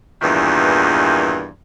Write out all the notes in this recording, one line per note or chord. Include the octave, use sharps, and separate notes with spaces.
E2 G2 A#2 D#3 E3